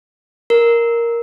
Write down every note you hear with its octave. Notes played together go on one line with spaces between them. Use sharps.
A#4